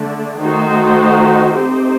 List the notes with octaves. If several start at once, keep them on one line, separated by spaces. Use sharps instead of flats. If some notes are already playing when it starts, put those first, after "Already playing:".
Already playing: D3 A3 D4
D#3 A3 D#4 F#4 C5
A3 C4 D#4 G4 C5